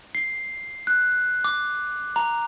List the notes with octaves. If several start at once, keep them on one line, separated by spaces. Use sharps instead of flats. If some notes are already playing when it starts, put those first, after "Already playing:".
C7
F#6
D6
A#5